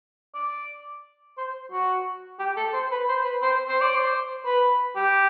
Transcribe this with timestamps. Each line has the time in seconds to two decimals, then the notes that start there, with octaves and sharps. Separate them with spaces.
0.34 D5
1.37 C5
1.72 F#4
2.39 G4
2.57 A4
2.73 C5
2.91 B4
3.09 C5
3.25 B4
3.42 C5
3.68 C5
3.81 D5
3.95 C5
4.45 B4
4.96 G4